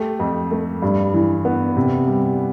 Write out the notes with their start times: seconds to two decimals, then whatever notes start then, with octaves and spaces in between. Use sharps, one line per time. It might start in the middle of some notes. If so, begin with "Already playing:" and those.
Already playing: A3 G4
0.20 F2
0.51 A3
0.82 G2
1.14 E3
1.45 B3
1.77 C3
2.08 G3